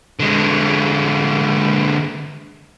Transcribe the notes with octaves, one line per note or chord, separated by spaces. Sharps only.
D3 G#3